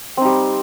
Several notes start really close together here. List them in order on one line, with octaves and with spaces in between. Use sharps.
C4 D#4 G3